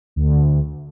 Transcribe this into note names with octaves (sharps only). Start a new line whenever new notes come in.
D2